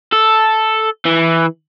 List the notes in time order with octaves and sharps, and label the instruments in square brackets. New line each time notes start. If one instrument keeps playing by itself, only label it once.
[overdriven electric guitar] A4
E3